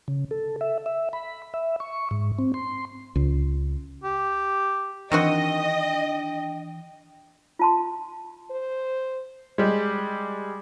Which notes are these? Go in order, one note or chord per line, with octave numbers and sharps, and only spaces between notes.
C#3
A4
E5
E5
B5
E5
C#6
G#2
C4
C6
C#2
G4
D#3 E3 C4 D4 F#4 D#5 G5
F4 A5 C6
C5
G3 G#3